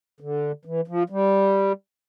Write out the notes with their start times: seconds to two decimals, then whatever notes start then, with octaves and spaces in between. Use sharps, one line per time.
0.20 D3
0.65 E3
0.88 F3
1.10 G3